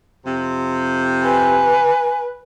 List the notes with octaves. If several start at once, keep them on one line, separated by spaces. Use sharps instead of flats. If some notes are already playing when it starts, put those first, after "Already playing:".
F2 C3
B4 G#5